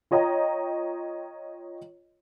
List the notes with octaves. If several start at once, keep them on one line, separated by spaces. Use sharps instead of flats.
F4 C#5 D#5 G5 A#5